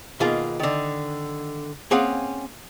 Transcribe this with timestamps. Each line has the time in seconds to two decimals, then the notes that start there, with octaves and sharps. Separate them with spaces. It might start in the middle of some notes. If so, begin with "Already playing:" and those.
0.20 B2 D#3 A#3 F4 G#4
0.60 D3 D#3
1.91 A#3 C4 C#4 G#4 F5 F#5